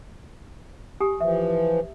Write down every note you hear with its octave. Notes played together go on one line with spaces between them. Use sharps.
G4 G#5 D#6
E3 F3 E5